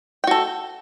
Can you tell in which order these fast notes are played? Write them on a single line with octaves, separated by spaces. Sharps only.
G5 F#4 A4